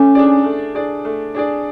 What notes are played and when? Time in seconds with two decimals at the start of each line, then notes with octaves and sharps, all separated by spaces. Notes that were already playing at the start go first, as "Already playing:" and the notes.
Already playing: A3 C#4
0.15 D4 G#4 D5
0.44 A3
0.75 D4 G#4 D5
1.05 A3
1.35 D4 G#4 D5